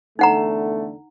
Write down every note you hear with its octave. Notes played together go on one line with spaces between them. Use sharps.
E2 D3 A3 D#4 F#5 A#5